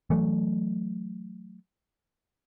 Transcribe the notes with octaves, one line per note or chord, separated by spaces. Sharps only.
E3 F#3 A3